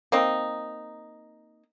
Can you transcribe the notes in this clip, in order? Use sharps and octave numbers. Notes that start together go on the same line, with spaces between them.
A#3 C4 D#4